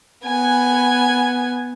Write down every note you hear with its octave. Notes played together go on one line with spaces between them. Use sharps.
B3 G#5